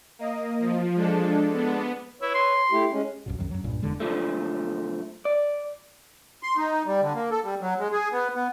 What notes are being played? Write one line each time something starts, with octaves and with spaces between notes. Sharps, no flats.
A#3 D#5
F3
G#3 D4 A4
B3
E4 B4 C#5
C6
A3 E4 G4
G#3 C#4
B1 F#2 B2
C2 F#2 D#3 F#3
F#2 F#3
C2 G2 A#2
E1 E2 D3 G#3
B1 D3 F3 A3
D5
C6
D#4
G3
D3
A#3
A4
G3
F#3
G#3
G#4
B3
B3